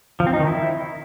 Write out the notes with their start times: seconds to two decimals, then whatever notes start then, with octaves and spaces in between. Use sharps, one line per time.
0.20 F3
0.27 C4
0.33 D#4
0.40 D#3
0.47 E4